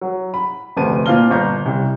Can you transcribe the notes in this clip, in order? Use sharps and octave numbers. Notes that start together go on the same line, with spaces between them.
F#3
B5
F1 D2 B4 C5 A5 D#7
A#2 C4 F5 F6 G7
G1 A#5 G6
C2